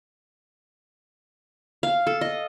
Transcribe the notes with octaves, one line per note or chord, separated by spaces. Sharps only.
F5
A4
D#5